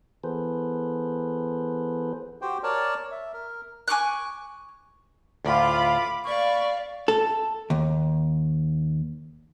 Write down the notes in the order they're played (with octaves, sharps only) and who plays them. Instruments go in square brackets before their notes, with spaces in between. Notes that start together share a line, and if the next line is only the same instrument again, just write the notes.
[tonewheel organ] E3 B3 G#4 A4 B4 C5
[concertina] F#4 G4 C5 G5
A#4 C#5 D5 A5
E5
A#4
[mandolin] G#5 C#6 D6 F#6
[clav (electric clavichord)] D2 A2 [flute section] F4 [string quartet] B5 D6
[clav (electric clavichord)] A#3 [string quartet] D5 F5 [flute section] B5 C#6
[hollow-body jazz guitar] A4
D#2